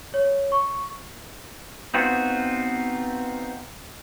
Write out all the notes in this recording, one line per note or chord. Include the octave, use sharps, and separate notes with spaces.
C#5
C#6
B3 C4 D#4 F4 F#4